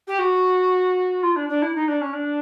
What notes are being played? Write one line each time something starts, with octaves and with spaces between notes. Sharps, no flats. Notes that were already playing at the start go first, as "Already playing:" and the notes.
G4
F#4
F4
D4
D4
E4
D#4
D4
C#4
D4